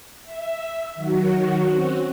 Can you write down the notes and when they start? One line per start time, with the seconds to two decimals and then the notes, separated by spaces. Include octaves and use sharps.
0.24 E5
0.95 D#3 F#3 F#4
1.69 C4 C#4 F#4